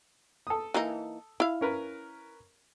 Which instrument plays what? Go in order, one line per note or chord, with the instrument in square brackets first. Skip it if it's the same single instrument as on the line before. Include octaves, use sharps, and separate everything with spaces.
[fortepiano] A4 D#6
[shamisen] E3 A#3 D#4
E4 F5
[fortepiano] C#4 A#4 B4